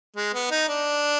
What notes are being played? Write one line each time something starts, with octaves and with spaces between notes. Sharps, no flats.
G#3
B3
D#4
D4